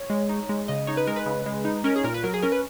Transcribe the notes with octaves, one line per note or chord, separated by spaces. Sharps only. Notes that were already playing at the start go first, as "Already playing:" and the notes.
Already playing: C#5
G#3
D#4
G#3
C#3 D#5
D#4 C#5
B4
G#3 A#4
B4
C#3
G#3
D#4
C#4 A#4
G#4
A#2 A#4
B4
F#3 A#4
G#4
C#4 A#4
B4